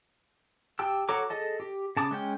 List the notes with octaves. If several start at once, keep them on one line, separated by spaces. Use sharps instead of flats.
G4 G5 A5 E6
F#4 A4 C#5 A#5 D6
G#4 A4 D#5 A5
G4
C#3 A5 D6 D#6
G#3 C#4 G5